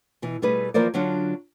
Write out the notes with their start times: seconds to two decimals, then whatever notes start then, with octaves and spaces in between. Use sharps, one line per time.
0.22 B2 E3
0.42 B2 G3 A3 G#4 B4
0.74 E3 F3 A#3 A#4 C5 D5
0.94 D3 F#3 C#4 D4 F4